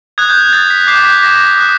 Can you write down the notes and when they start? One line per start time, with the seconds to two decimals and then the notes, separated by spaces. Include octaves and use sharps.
0.18 D#6 F#6 G#6
0.30 G6
0.41 G#6
0.53 D#6 F#6 A6
0.70 B6
0.87 D6 G6 C7
1.05 B6
1.23 D6 G6 A#6
1.58 D#6 F#6